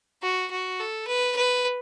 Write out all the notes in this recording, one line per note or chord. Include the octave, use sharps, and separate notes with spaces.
F#4
F#4
A4
B4
B4